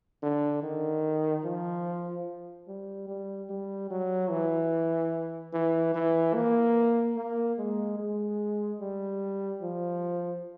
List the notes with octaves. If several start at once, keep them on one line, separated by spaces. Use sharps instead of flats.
D3
D#3
F3
G3
G3
G3
F#3
E3
E3
E3
A#3
A#3
G#3
G#3
G3
F3